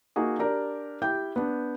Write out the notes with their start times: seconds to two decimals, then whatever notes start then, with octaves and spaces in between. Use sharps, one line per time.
0.16 A#3 D#4 F#4 G#4
0.39 D4 G4 A#4 D5
1.02 E4 G4 G5 G6
1.36 B3 D4